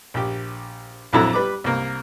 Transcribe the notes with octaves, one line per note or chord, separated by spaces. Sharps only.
A#1 G4
A#1 F2 F#3 E4 A4 A#5
G3 B4 D6
C2 A#3